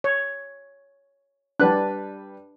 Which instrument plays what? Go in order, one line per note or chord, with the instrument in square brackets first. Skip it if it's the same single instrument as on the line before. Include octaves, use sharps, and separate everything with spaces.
[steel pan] C#5
[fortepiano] G3 B4 F#6 [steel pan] D4